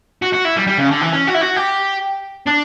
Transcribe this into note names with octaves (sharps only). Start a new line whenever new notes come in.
F#4
F#4
E4
G3
G3
C#3
D3
E3
C#4
F#4
E4
F#4
G4
D4